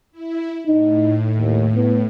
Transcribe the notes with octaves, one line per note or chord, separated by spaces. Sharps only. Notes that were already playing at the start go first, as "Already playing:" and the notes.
E4
A2 D#4
D#2
B3